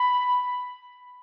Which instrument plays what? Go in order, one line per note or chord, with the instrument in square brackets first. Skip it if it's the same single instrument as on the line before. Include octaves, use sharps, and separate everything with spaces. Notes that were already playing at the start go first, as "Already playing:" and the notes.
Already playing: [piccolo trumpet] B5